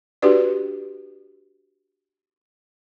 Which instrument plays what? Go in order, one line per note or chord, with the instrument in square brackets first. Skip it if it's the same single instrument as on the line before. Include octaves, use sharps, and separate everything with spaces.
[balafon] D4 F#4 G4 B4 D5